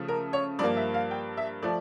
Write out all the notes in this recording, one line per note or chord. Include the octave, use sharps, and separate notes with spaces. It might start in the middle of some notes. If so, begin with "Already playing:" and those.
Already playing: C#3 F3 A3
A#4
C#5
G2 F3 A#3 D5
E5
F5
G5
E5
F3 A3 D5